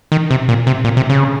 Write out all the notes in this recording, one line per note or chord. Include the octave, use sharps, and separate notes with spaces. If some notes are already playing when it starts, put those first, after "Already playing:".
D#3
C3
A#2
C3
A#2
C3
C#3